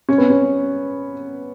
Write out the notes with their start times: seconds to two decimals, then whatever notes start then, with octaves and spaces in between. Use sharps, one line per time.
0.09 C#4
0.18 B3
0.30 C#4